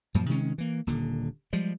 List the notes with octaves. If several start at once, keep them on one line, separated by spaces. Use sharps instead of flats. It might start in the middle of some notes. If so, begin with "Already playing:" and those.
F#2 A#2 F3
C3 D#3 G#3 C#4
E3 A#3
D#1 A#2 D3
F3 G3 G#3